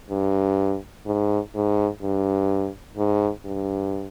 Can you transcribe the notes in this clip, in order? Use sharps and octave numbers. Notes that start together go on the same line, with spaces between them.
G2
G#2
G#2
G2
G#2
G2